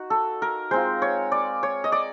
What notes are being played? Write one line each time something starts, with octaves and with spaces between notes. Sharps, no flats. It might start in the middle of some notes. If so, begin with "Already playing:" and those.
Already playing: D#4 F#4
A4
A#4
G#3 C4 F4 C5
C#5
D5
C#5
D#5
D5